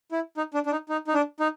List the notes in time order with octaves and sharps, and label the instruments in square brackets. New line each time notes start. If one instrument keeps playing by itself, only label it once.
[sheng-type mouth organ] E4
D#4
D4
D4
D#4
D#4
D#4
D4
D#4